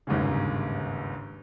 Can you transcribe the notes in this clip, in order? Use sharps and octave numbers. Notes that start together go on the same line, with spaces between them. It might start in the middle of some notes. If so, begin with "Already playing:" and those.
G1 D#2 G#2 C#3